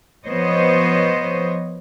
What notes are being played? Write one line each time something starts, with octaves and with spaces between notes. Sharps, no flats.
F3 B3 C5 C#5 D#5